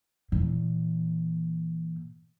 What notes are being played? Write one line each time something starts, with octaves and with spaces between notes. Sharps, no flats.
A#2 E3